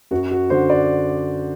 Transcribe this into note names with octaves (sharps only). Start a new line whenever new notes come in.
F#2 F#4
F#4
D3 C5
D5